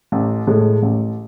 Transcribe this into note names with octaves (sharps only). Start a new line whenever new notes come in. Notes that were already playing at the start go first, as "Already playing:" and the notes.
A1
A2 G#3
A1